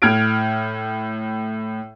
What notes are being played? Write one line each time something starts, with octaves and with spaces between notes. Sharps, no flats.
A2 F6 G#6 D7